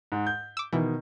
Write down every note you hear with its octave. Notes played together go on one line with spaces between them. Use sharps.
G#2
G6
D6 E6
B2 D#3 E3